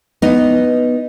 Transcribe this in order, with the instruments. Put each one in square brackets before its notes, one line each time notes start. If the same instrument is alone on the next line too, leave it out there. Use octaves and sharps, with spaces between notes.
[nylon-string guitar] B3 D#4